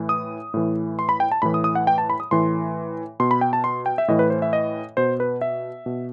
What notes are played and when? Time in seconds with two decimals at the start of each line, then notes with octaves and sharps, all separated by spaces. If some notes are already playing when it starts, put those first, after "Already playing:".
Already playing: A2 E3
0.09 D#6
0.54 A2 E3
0.99 C6
1.09 B5
1.20 G5
1.32 A5
1.42 A2 E3 B5
1.54 D#6
1.64 D#6
1.75 F#5
1.87 G5
1.98 A5
2.10 B5
2.20 D#6
2.31 A2 E3 C6
3.20 B2 C6
3.31 B5
3.41 G5
3.53 A5
3.64 C6
3.86 G5
3.98 E5
4.08 A2 E3 D#5
4.19 B4
4.30 C5
4.42 E5
4.53 D#5
4.97 B2 C5
5.20 B4
5.41 E5
5.86 B2